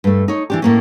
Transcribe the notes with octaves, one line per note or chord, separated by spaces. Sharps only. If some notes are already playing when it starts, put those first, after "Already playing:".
G2 A3
D#4 C#5
E3 D4 G4
A2 A#3 C#4